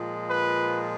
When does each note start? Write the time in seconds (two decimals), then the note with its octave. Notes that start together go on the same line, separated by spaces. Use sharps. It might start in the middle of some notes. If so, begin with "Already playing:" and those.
Already playing: A#2 F3 G#3
0.30 B4